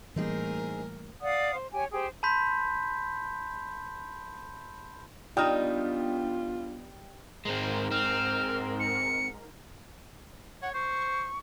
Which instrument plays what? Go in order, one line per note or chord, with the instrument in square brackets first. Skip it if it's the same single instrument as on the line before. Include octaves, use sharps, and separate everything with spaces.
[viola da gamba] A2 A#4 [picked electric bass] E3 G3 A#3 [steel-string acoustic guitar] C4 D#4 G#4
[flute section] D5 F5 F#5 D#6
C5
G4 C#5 G#5
G4 G#4 C5
[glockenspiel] A5 B5 C6 G6 B6
[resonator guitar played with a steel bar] G3 D#4 [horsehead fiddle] B3 D4 [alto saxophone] F4 [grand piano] G5 D#6 F6
[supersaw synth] G#2 A#4 [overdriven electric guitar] G#3 C4
[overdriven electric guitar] C4 [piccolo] F6
[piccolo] C#7
[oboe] C#5 [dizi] F#5
[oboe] C5 [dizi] C#6